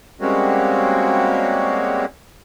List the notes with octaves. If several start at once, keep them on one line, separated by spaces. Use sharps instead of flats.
G3 G#3 A#3 C4 C#4 F#4